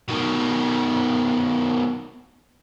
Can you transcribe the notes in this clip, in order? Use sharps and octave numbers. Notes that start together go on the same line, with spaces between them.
B2 D#3